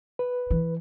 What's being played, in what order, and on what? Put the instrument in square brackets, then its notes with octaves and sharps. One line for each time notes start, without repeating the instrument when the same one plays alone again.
[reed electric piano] B4
[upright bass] E3